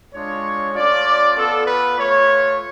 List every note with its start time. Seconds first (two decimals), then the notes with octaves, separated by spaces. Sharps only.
0.13 G#3 D4 F4 C#5
0.74 A3 C#4 F4 D5
1.36 B3 F4 A4
1.66 B4
1.97 A3 F4 C#5